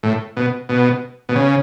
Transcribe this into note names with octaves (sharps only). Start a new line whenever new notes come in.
A2
B2
B2
B2
C#3